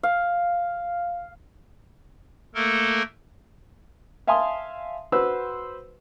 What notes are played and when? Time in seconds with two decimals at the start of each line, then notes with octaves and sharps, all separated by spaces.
0.03 F5
2.55 A3 A#3 A4 A#4
4.27 E5 F5 G#5 A5 C6 D#6
5.12 F#4 B4 C5 E6